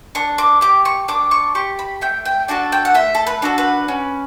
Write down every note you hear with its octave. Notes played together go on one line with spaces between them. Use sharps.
D4 C#6
D6
G4 D6
C#6
D4 D6
C#6
G4 C#6
B5
A3 G5
G5
D4 F#4 A4 A5
G5
F#5
A3 E5
A4
B4
D4 F#4 A4
B4
C#4